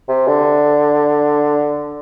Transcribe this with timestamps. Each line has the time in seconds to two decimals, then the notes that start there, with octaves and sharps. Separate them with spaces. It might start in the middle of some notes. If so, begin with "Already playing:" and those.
0.09 C3
0.28 D3